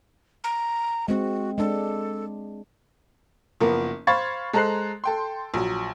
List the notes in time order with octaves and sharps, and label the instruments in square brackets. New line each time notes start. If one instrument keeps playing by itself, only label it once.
[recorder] A#5
[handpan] G#3 C4 [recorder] F#4
[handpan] G#3 D4 [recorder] A4
[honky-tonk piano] F#1 F3 A#3 B3 A#4
C5 F5 B5 C#6 G#6 A6
G#3 A4 C5 A#5 F#6 C7
A4 G5 C6
A#1 F#3